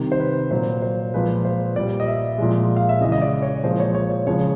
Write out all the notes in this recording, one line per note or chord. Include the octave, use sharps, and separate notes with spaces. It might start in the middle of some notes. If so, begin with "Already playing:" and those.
Already playing: C3 D#3 G3
C5
B4
A#2 F#3 C5
C5
A#2 F3 G#3 B4
C5
A#2 G3 D5
D#5
E5
A#2 F3 G#3
F5
E5
C#3 E3 G#3 D#5
D#5
D5
C#5
A#2 F3 G#3 C5
C#5
C#5
C#5
C#3 F3 G#3 C#5